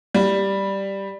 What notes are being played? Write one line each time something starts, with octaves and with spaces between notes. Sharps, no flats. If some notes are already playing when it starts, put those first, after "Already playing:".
G3